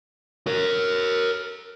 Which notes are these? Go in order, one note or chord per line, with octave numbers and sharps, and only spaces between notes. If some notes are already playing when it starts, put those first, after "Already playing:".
A#4 C#5